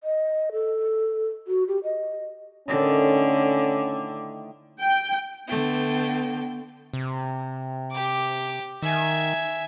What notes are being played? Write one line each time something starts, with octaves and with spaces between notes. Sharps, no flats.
D#5
A4
F#4
G4
D#5
A2 D3 D#3 C#4 D5
G5
D3 A3 B3 G5
C3
G4 D6
D#3 E5 G#5